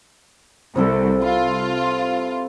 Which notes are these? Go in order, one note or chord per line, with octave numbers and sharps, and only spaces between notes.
C2 C3 E4 A4
E4 F4